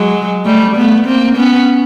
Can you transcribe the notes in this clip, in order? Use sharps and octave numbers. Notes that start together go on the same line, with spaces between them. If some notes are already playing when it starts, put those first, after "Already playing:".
Already playing: F#3 G#3
G3 A3
A3 B3
A#3 C4
B3 C#4